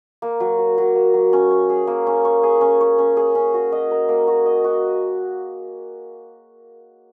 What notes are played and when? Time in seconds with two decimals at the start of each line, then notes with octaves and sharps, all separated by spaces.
0.22 A#3
0.40 F#3
0.58 F#4
0.78 F#3
0.95 A#3
1.14 F#3
1.33 C#4
1.50 C#5
1.70 G#4
1.87 A#3
2.07 C#4
2.25 C#5
2.43 G#4
2.61 C#4
2.81 C#5
2.98 C#4
3.17 G#4
3.35 C#4
3.54 F#4
3.72 D#5
3.91 A#4
4.09 A#3
4.27 F#4
4.46 D#5
4.64 F#4